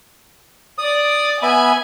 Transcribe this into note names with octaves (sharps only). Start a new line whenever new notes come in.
D5 D#6
B3 E5 G#5 B5